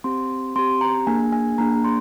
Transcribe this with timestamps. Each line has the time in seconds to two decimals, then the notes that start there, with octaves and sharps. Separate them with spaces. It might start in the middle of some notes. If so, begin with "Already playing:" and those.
0.04 C4 G4 C6
0.56 C4 G4 C6
0.81 A#5
1.07 A#3 D4 G#4 G#5
1.33 G#5
1.58 A#3 D4 G#4 A#5
1.84 C6